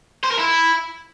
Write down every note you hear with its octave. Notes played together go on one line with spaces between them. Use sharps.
C5
A#4
E4